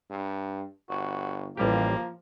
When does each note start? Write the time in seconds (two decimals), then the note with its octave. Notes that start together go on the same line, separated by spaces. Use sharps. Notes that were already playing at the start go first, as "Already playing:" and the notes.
0.11 G2
0.90 G1 F#4
1.57 A1 F3 G3 A#3 G4